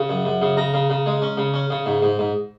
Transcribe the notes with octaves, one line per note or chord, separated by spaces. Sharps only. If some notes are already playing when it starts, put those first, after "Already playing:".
Already playing: C#3
F#2
F#2
C#3
C#3 A#5
C#3
C#3
G#3
C#4
C#3
C#4
C#3
G#2
G#2
G#2